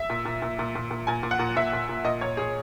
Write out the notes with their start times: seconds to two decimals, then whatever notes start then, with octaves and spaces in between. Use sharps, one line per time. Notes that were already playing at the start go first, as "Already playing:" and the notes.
Already playing: E5
0.10 A#2
0.25 A#2
0.42 A#2
0.59 A#2
0.75 A#2
0.91 A#2
1.07 A#2 G#5
1.23 A#2
1.31 F#5
1.39 A#2
1.56 A#2 E5
1.73 A#2
1.89 A#2
2.04 A#2 D#5
2.21 A#2 C#5
2.37 A#2 G#4